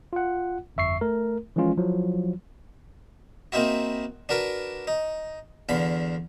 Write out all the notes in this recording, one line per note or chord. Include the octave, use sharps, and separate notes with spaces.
F4 F#5
G1 F2 E5 C#6 C7
A3 A#4
E3 F3 G#3 C#4 F4
F3 F#3 E4
A#3 C4 D#4 E4 F#4
D4 F#4 A#4 B4
D#4
E2 D3 F5 B5